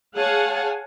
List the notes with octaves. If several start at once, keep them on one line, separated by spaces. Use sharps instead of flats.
G#4 C#5 F5 F#5 G#5 A5